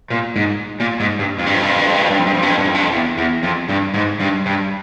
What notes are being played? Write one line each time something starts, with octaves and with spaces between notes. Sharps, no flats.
A#2
G#2
A#2
G#2
G2
F2
G2
F2
G2
F2
G2
F2
G2
F2
G2
F2
G2
F2
G2
F2
G2
F2
G2
F2
E2
E2
F2
G2
G#2
G2
G2